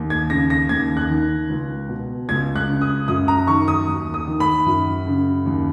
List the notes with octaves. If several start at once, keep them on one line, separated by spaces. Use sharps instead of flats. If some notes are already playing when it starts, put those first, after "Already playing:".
Already playing: D#2
G#6
C#3 A#6
A#6
D#2 G#6
F#6
D#3
C#2
B2
C#2 G#6
F#6
C#3
D#6
F#2 D#6
A#5
D#3 C#6
D#6
D#2
D#6
D#3
B5
F#2
C#3
D#2